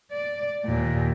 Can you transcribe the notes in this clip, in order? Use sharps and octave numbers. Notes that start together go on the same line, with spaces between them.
D5
D#2 A#2